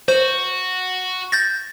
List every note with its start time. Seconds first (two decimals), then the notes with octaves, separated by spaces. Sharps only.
0.08 F#4 C5
1.32 G6 A6 A#6